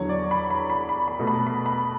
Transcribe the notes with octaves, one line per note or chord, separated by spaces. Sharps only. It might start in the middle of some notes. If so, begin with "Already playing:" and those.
Already playing: E2 D3 F#3 C#5
D5
B5
B5
B5
B5
B5
B2 A3
B5
B5
B5